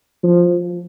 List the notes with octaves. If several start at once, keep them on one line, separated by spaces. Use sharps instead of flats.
F3